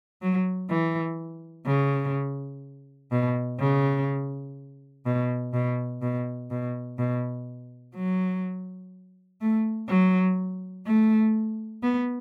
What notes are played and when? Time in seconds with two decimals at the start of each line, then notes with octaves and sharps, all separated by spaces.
0.22 F#3
0.69 E3
1.66 C#3
3.12 B2
3.60 C#3
5.05 B2
5.53 B2
6.02 B2
6.51 B2
6.98 B2
7.96 F#3
9.41 A3
9.89 F#3
10.86 A3
11.83 B3